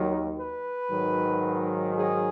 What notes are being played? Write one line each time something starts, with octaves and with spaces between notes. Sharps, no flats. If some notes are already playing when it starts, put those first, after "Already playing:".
Already playing: D#2 D#3 F#3
B4
G#2 D#3 F#3
G#4